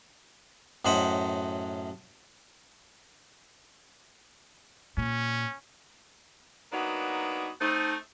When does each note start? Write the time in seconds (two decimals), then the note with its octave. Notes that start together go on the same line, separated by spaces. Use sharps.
0.85 F#2 A2 C5 D#5 F#5 B5
4.97 A#2 C#4
6.72 F#3 A#3 B3 D4 D#4 F#4
7.60 A3 C4 D#4